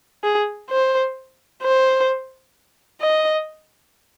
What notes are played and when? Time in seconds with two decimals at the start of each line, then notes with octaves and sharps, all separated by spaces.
0.24 G#4
0.70 C5
1.63 C5
3.01 D#5